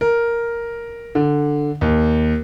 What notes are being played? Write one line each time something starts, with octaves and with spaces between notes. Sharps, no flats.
A#4
D3
D#2